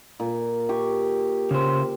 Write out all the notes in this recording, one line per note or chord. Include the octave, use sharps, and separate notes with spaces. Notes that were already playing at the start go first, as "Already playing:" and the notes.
A#2
G4 C#6
C#3 C5